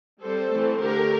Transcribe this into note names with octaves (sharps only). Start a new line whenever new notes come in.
G3 C4 A4 C5
E3 A3 C4
D3 A3 D4 G4 A#4